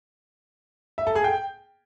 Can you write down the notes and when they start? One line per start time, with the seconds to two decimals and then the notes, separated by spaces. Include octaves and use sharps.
0.98 E5
1.07 A4
1.15 G#4
1.24 G5